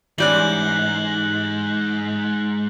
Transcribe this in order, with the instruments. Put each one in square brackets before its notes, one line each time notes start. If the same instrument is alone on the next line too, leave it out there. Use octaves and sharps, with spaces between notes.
[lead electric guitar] G#2 [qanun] E3 G3 C#4 [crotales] F#6 G6 F#7